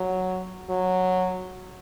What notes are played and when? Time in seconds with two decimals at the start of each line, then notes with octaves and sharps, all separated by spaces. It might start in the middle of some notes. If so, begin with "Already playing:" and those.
Already playing: F#3
0.70 F#3